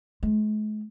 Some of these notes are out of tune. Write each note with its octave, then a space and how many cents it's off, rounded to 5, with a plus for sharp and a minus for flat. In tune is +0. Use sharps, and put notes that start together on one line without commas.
G#3 +45